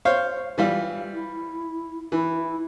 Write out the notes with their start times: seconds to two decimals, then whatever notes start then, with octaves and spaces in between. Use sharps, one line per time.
0.05 C5 C#5 F5
0.58 E3 G3 F4
1.13 E4
2.12 E3 E4